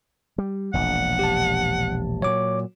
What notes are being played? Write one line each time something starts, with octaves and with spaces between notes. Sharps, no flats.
G3
E1 A#1 F#5
G4 A5
A#2 F#3 C#5 D6